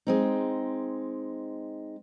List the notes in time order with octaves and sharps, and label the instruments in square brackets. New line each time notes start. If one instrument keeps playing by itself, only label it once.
[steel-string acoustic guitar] G#3 C4 D#4